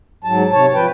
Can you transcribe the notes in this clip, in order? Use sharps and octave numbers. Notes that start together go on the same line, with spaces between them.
G#2 F#3 A5
C3 C#5 A5
F3 B4 G5